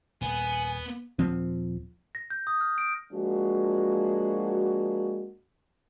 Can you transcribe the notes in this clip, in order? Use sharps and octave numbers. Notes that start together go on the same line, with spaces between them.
D#1 B3 G#5
D#1 F3 C4
A#6
G6
D#6
F6
D7
F3 G#3 A#3 D4 F#4